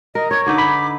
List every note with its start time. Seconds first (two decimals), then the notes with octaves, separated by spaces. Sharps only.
0.15 A#4 D#5
0.31 C#5 D5 G#6
0.46 D3 D#4 B4 D6
0.58 B5